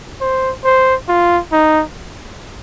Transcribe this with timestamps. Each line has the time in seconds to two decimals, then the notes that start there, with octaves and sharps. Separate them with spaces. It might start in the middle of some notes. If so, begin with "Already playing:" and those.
0.21 C5
0.64 C5
1.08 F4
1.52 D#4